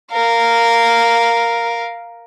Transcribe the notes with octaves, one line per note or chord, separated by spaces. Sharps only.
A#4 F5